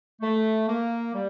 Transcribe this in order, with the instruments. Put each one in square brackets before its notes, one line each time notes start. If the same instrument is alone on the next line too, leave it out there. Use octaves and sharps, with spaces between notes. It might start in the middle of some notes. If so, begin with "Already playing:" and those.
[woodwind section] A3
A#3
G3